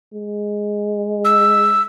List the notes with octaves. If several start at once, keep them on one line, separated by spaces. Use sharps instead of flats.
G#3
E6